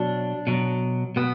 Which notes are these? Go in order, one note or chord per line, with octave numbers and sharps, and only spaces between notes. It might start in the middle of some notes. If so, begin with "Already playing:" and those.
Already playing: B2 F#3 D4
B2 F#3
B2 B3